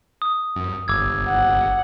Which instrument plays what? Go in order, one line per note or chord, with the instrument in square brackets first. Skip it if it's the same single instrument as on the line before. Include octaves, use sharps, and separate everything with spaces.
[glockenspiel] D#6
[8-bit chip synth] F#2
[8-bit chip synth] G1 [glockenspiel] D6 E6 G#6
[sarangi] F#5